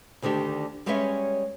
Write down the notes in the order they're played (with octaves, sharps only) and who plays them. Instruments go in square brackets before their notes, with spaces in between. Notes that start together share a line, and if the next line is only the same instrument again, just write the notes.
[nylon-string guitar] D2 D3 D#3 D4 G4
G3 G#3 C#4 B4 C#5 E5